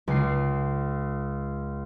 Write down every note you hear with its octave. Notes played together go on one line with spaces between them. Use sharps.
C#2 C7